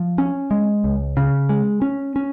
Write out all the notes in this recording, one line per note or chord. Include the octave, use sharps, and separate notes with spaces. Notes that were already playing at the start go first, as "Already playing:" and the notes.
Already playing: F3
C#4
G#3
C#2
C#3
G#3
C#4
C#4